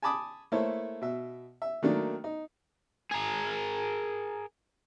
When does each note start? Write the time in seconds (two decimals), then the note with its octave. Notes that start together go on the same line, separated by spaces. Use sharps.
0.02 G#5 A5 B5 D6 D#6
0.52 A3 A#3 E4 A4 C5 C#5
1.02 B2 E5
1.62 E5
1.83 D#3 F#3 A3 A#3 D4
2.24 D#4
3.11 G#4 A#4